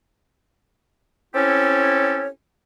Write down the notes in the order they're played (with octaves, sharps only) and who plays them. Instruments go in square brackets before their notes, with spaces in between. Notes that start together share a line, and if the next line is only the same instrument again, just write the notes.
[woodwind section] C4 C#4 E4 G4 A4 C#5